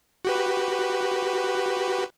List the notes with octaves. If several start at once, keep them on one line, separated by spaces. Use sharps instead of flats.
F#4 G4 B4